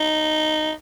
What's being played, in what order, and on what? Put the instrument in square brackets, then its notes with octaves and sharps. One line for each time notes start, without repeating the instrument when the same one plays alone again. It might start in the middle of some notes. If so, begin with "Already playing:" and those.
Already playing: [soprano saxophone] D#4